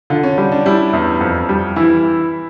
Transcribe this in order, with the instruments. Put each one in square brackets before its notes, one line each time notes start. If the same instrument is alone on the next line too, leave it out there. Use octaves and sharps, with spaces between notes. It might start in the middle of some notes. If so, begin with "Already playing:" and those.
[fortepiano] D3 [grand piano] F4
[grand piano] C#4
[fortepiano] G3 [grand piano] D4
[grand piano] D4
[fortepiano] G3 [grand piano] E4
[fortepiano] E2
F2
G3
[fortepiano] E3 [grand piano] E4